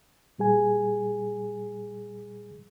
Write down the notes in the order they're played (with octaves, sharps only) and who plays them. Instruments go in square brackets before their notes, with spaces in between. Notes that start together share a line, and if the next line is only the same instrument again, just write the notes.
[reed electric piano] A#2 G3 G#4 G#5